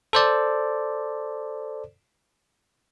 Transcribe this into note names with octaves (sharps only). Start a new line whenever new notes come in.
A4 C5 D5